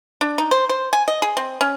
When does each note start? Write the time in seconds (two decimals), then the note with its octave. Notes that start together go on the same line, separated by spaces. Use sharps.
0.21 D4
0.38 D#4
0.51 C5
0.69 C5
0.93 G#5
1.08 D#5
1.22 G#4
1.37 C4
1.61 C#4